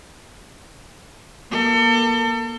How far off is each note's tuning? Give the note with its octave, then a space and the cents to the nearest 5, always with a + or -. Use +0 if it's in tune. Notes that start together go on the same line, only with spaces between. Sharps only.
A#3 +25 A4 +35